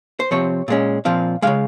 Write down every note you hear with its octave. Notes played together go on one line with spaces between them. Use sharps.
C5
C3 F3 C4 C#5
A#2 G#3 C#4
A#2 F3 C4 F5
C#3 E3 G#3 F5